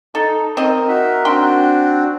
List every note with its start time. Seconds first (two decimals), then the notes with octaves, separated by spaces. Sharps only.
0.15 D#4 A4
0.57 C4 A#4 D#5
0.88 D#4 F#4 E5
1.25 C4 D4 F#4 G5 C6